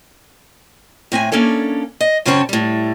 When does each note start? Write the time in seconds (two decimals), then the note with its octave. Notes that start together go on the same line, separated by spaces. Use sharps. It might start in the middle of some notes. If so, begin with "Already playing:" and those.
1.12 A2 C4 E5 G#5
1.32 A#3 C#4 D4 A4 C#5
2.00 D#5
2.25 F#2 C#3 C4 C#4 C#5 A5
2.49 A2 G3